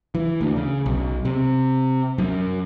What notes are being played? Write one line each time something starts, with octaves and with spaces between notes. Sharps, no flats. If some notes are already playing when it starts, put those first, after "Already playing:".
E3
D2
C#3
B1
C3
F#2